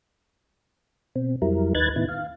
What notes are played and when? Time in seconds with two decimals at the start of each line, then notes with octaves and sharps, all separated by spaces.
1.16 B2 C4
1.42 F2 F#3 G3 E4 A#4
1.75 D#2 D#4 B4 F#6 G#6 A6
1.96 A2 D#3 B3 E4
2.09 F5